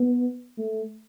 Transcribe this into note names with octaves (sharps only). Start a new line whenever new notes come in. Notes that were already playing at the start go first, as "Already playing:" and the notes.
Already playing: B3
A3